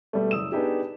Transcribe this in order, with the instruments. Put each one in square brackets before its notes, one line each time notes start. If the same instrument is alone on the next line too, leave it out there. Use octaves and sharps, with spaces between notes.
[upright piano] B2 G3 A3
F#1 D#6 E6 E7
B3 D4 D#4 G4 G#4